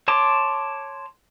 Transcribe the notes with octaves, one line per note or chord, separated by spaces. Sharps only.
C#5 A5 C6 D6